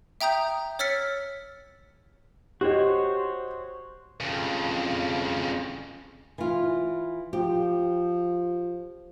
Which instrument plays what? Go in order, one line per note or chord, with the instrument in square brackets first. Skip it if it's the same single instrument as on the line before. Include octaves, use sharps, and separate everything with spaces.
[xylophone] E5 G5 A#5 D#6 G6
C#5 E6 F6 A6 B6 C#7
[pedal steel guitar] F#4 C5 C#5 [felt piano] G4 D#5
[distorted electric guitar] F2 C#3
[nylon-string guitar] E3 F4
[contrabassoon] F3 [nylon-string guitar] G4